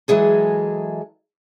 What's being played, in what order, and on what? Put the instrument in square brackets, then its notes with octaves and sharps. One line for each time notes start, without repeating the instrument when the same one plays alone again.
[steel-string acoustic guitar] E3 F#3 G#3 G#4 A4